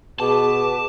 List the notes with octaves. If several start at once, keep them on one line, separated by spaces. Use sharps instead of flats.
B2 G#4 B4 A5 D6